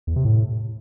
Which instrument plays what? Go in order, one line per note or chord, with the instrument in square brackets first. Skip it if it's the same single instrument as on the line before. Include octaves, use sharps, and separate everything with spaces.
[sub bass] E2
C3
A2